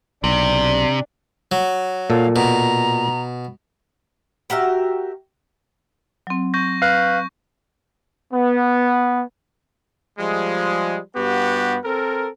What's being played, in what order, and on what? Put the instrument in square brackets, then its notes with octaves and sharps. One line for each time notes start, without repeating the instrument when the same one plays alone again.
[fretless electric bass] B1 [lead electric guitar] C3 [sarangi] D4
[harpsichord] F#3
[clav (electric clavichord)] A#2 A4 [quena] F5
[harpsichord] B2 [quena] A#5
[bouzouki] F#4 G4 A#4 E5
[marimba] F#3 C4
[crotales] C#6 G6 A#6
[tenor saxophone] B4 [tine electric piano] F5
[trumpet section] B3
[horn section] F3 G3 G#3
G2 B3 F#4 G4
C4 A4 A#4